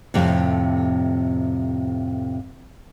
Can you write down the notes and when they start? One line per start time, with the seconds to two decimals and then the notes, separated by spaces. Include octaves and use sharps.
0.14 F2 A2 C3